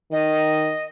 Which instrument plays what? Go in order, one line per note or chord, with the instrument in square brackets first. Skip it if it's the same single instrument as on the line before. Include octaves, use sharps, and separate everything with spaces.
[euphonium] D#3 [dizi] D#5